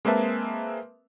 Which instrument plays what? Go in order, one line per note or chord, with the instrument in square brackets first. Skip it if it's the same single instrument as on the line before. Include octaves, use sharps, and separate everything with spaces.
[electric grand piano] G#3 A#3 C4 B4 E5 A5